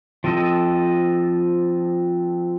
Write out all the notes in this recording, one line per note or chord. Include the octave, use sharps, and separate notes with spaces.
F3 C4 A4 D#5